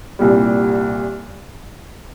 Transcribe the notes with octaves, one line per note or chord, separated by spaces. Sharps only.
C2 A#2 G3